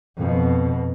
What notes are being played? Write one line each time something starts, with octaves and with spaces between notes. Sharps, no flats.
F2 B2